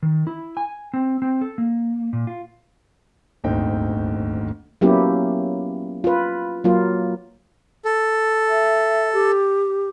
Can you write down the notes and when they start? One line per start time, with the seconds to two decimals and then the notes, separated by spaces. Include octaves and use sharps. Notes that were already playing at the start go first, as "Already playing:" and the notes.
0.03 D#3
0.27 E4
0.57 G#5
0.94 C4
1.22 C4
1.41 A4
1.58 A#3
2.13 A#2
2.27 F4
3.44 D#1 G#1 D2 D#4 G5
4.81 F#3 A#3 B3 C#4 E4 G4
6.04 F4 B4
6.64 F#3 A#3 F4
7.85 A4
8.49 E5
9.13 G4